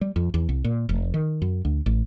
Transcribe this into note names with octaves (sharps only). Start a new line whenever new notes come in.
G3
F2
E2
C2
A#2
F1
D#3
F#2
D2
A1